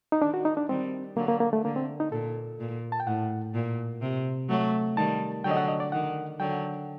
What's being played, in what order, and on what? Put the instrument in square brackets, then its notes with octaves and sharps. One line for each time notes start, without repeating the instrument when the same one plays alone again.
[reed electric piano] D#4
[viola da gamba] D#3 [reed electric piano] D4
[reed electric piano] F#4
D#4
D4
[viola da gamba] D#3 G3 [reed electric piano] C4
[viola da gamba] D3 F#3 [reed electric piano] A#3
[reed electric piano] A#3
A#3
A3
[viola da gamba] D3 [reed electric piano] A#3
[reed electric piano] C4
D#4
[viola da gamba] A#2 [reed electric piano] A4
[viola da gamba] A#2
[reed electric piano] A5
G5
[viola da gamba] A2 [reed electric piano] F#5
[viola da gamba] A#2
C3
F#3 A3
[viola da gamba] D#3 G3 [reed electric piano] A5
[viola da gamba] D3 F#3 [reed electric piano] G5
[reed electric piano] D#5
F#5
D#5
D5
[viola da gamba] D#3 [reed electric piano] F#5
[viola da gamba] D3 F#3 [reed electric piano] G5